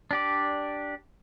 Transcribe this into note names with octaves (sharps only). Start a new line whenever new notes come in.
D4 G4 D5